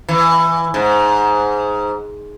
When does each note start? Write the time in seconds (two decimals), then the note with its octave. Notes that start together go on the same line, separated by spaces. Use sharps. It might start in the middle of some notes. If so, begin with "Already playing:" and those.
0.09 E3
0.74 G#2